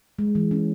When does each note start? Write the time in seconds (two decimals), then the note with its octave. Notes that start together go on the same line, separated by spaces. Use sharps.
0.19 G#3
0.35 E3
0.51 C#4